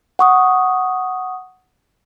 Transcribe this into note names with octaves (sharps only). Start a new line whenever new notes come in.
F#5 C#6 D#6